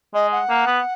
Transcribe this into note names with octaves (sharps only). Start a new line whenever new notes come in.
G#3 D#5
F#5
A#3
B3